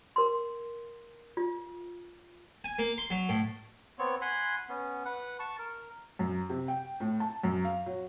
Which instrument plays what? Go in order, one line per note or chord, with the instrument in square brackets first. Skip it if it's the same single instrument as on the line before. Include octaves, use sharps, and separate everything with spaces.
[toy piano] A#4 C6
F4
[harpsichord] G#5
A#3
C6
F#3
A2
[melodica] B3 C4 C#5
F#5 G#5 B5 C6
B3 C#4
B4 F#5
A5 C#6
A#4
[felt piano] F#2
C3
G5
A2
A5
F#2
F5
F#3